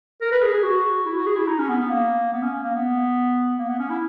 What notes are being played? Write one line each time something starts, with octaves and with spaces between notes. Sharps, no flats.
A#4
B4
G#4
G#4
F#4
E4
F#4
G#4
E4
D#4
C#4
B3
B3
A#3
B3
C#4
A#3
B3
A#3
B3
C#4
E4